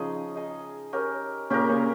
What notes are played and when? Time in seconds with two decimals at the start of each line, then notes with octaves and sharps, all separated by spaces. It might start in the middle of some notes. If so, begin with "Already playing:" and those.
Already playing: C#3 F3 D#4 G#4 D#5
0.36 D#4 G#4 D#5
0.93 C#4 G4 A#4
1.50 A#2 C#3 C#4 G4 A#4
1.69 A#2 C#3